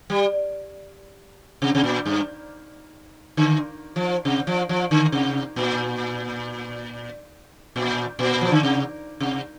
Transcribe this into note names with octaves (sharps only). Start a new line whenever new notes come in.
G3
C3
C3
A#2
G2
D3
F3
C3
F3
F3
D3
C3
A#2
A#2
A#2
F3
D3
C3
C3